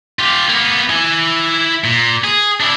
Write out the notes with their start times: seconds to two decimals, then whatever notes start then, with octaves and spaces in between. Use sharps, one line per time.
0.19 F4 G4
0.49 A#3 B3
0.90 E4 G#5
1.84 A#2
2.24 G#4
2.60 D4 E4